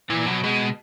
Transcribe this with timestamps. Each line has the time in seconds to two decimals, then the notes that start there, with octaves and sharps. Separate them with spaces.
0.10 A#2 E3
0.27 B2 F#3
0.44 B2 G#3